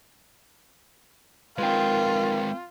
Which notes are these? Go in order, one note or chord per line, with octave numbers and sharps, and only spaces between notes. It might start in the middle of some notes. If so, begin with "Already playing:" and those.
F3 G#3 C4 D#4 F4 A#4 B4 G5